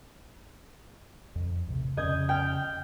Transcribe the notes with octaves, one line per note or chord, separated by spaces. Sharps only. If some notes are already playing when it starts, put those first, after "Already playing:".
F2
A1 D#2 C3
F2 C#3 C#4 D#5 G6 G#6
G5 F6